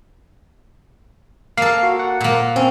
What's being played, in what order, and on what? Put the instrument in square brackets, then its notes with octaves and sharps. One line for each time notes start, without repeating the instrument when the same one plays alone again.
[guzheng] A#3 A4 [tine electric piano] F5 C7
[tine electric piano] F#4
F#5
[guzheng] A#2 A#3
[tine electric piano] C4 [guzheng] C#4